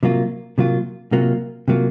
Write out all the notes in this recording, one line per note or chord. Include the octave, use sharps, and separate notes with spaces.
C3 F#3 A#3 F4
C3 F#3 A#3 F4
C3 F#3 A#3 F4
C3 F#3 A#3 F4